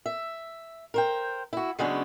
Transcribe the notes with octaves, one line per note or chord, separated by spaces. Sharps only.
E5
A#4 C5 G5
E4 F#4
C#3 F#3 G#3 B3 C#4 D4